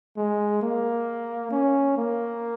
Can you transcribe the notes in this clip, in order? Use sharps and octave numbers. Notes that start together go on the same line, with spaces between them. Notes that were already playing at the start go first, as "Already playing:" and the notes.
G#3
A#3
C#4
A#3